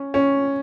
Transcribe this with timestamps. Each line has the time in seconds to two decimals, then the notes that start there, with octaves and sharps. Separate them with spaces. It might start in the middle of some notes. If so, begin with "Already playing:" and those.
Already playing: C#4
0.14 C#4